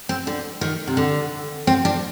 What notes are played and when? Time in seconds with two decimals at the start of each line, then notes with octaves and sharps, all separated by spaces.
0.09 C4
0.27 D3
0.61 D#3
0.88 C3
0.97 D3
1.67 C4
1.85 D4